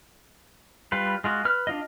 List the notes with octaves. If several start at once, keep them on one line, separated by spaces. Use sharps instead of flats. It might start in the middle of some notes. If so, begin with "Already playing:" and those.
G3 F4 B4
G#3 F4 F#4
B4 F6
D4 F4 D#5